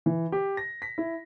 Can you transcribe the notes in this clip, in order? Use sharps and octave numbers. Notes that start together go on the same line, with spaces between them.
E3
G4
A#6
B6
E4